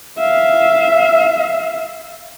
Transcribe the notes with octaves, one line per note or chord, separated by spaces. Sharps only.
E5 F5